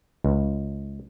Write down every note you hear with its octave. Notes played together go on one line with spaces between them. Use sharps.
C#2